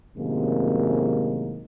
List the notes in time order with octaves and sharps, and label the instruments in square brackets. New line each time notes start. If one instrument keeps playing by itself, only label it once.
[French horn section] F#2 A2 C3 D#3 G#3 A#3